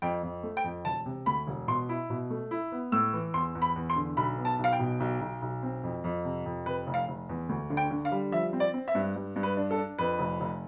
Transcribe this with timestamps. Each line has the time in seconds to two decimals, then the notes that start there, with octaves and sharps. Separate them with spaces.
0.02 F2 G5
0.23 F2
0.43 A3
0.57 G5
0.64 F2
0.85 E1 A5
1.06 C3
1.26 D2 B5
1.47 E1
1.68 B2 C6
1.89 E4
2.10 B2
2.30 A3
2.51 E4
2.72 B3
2.92 A2 E6
3.13 E3
3.34 E2 C6
3.55 E2
3.62 B5
3.76 E2
3.90 C6
3.96 D3
4.17 B1 B5
4.38 B3
4.45 A5
4.59 B1 F5
4.73 G5
4.79 B2
5.00 B1
5.21 B1
5.42 B1
5.63 C4
5.83 F2
6.04 F2
6.25 C3
6.45 F2
6.66 C3 B4
6.87 F1
6.94 F5
7.08 F1
7.29 E2
7.49 D2
7.70 D3
7.77 G5
7.91 D3
8.05 F5
8.12 G3
8.32 F3 E5
8.53 C4
8.60 D5
8.74 C4
8.88 E5
8.95 G2
9.16 G2
9.36 G2
9.43 B4
9.57 D4
9.71 A4
9.78 D4
9.98 F2 B4
10.19 F1
10.40 F1